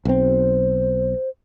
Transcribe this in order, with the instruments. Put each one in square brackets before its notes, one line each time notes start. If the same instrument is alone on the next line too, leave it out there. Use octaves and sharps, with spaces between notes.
[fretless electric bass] B1 C4 [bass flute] C5